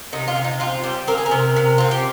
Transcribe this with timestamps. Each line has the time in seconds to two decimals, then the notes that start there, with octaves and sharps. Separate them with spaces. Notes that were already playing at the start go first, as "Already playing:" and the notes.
0.13 C3 D#4
0.28 F4
0.36 C3
0.44 D#4
0.60 C4 F4
0.83 G3 G4
1.07 C4 A#4
1.18 G#4
1.26 A#4
1.31 C3
1.56 C3
1.78 C4 F4
1.91 G4